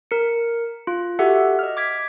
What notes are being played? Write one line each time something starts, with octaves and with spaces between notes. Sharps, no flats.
A#4 C#7
F4
F#4 G4 A4 E5 F#5
D#5 F6
D6 G#6 B6